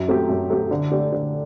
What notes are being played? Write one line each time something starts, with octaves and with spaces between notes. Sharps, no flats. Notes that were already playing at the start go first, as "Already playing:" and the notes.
Already playing: F#2
F#3 A3 C4 G4
F#2
F#3 A3 C4 G4
D3
A3 D4 G4
D3